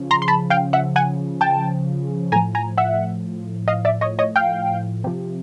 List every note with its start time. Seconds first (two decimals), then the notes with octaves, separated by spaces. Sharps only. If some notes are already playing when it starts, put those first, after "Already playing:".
Already playing: C#3 F3
0.11 A#5 C6
0.22 C6
0.28 A5 B5
0.50 F5 G5
0.73 E5 F#5
0.96 F#5 G#5
1.41 G5 A5
2.32 A2 G#5 A#5
2.36 F3
2.55 G#5 A#5
2.77 E5 F#5
3.68 D#5 F5
3.85 D5 E5
4.01 C#5 D#5
4.19 C#5 D#5
4.36 F5 G5
5.04 C3 F3